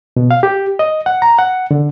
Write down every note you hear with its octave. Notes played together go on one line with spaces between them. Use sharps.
B2
F5
G4
D#5
F#5
A#5
F#5
D3